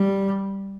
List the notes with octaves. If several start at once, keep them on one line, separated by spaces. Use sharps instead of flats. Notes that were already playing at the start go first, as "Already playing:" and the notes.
Already playing: G3